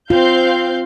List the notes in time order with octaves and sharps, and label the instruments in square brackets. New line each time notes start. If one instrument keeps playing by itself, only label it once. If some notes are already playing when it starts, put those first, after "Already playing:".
[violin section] C4 F5 G6 [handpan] F4